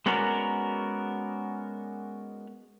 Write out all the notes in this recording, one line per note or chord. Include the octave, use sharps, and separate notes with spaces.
G#3 B3 C#4 F#4 A#4 D5